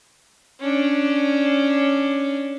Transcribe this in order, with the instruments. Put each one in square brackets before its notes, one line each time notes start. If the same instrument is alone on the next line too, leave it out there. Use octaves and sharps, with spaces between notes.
[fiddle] C#4 D4